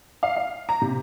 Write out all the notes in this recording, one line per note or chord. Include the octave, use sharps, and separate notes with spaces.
F5
F5
A#5
C3